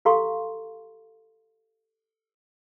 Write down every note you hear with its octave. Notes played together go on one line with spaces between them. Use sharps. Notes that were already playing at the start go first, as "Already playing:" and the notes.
G4 A4 F5 A#5 C6 C#6